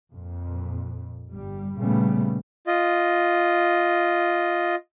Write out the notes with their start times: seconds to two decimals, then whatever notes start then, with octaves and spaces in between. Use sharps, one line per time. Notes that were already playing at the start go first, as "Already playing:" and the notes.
0.13 F2 A#2
1.30 G1 G3
1.78 A#2 C#3 G3 A3 B3
2.67 F4 D#5